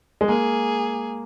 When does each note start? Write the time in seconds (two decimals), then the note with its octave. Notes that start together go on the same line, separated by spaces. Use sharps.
0.21 G#3
0.29 A#3 G#4